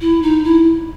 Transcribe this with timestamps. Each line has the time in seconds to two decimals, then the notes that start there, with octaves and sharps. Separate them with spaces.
0.01 E4
0.22 D#4
0.44 E4